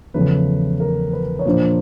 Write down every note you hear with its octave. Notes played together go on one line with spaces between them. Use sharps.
E2 C#3 F3 A3 B4
A#4
B4
C#5
A#2 F3 A#3 D4 C5